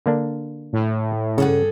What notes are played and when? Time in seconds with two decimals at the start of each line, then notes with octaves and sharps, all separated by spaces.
0.06 D3 A#3 D4
0.73 A2
1.38 G2 C#3 G#4 A4 F#5